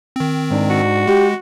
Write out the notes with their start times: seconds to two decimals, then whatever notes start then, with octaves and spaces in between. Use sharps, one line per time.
0.16 D#3 C4
0.51 G#2 D4
0.70 F#4
1.07 G#3 G4